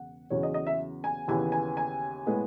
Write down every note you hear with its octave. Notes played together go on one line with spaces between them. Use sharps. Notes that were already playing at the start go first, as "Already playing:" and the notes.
Already playing: E1 C#3 F#5
E2 C#3 F#3 C#4 C#5
D#5
D#5
E5
G#5
D#2 C#3 E3 B3 G#5
G#5
G#5
A2 G#3 B3